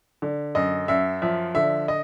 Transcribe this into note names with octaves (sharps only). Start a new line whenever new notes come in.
D3
F#2 D#5
F#2 E5
F3 E5
D3 E5
D#5